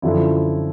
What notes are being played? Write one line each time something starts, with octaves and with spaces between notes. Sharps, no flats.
F#2 D3 F3 E4